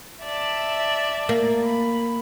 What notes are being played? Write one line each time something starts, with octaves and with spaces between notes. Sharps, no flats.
D5 E5 A5
A#3
B5